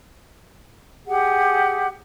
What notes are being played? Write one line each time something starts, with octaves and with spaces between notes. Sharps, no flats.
G4 G#4 F#5